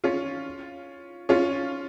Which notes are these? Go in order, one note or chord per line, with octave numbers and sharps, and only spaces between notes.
C#4 F4
C#4 F4